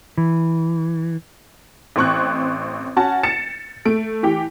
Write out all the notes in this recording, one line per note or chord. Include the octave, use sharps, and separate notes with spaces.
E3
A1 C4 C#6 F#6
C#4 F#4 F#5 A5
A6 C#7 E7
A3 D7
E3 G4 G5